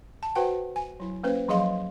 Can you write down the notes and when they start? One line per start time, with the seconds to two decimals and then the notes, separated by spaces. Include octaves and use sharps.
0.23 A5
0.35 F#4 B4 C5 F#5 G5
0.76 G#5
1.00 F#3 E4
1.24 A#3 C#4 B4 C5
1.48 F3 F#3 G#4 D#5 F5 C6